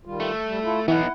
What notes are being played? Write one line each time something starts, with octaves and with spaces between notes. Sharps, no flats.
D#3 G3 F4
A3
G3
E4 F4 A4
E3 B3 D#4 E4 F#5